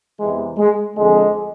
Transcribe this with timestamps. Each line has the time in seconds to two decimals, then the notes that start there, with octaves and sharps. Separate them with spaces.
0.20 E2 C3 E3 G#3
0.58 G#3
0.96 F2 D3 G#3